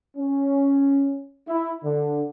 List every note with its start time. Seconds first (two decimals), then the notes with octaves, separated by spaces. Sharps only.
0.17 C#4
1.48 E4
1.84 D3